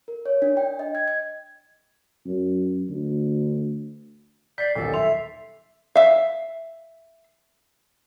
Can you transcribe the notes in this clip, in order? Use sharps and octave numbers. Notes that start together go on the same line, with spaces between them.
A#4
C#5
D4
G5
D#5
G#6
G#6
F#2
D2
D5 G6 B6 C7
D#1 B1 A4
E5 C6 F7
E5 F5